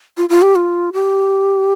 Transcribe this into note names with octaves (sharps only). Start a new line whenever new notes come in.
F4
F4
G4
F4
G4